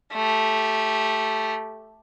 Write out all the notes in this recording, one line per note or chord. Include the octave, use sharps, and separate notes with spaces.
A3 G4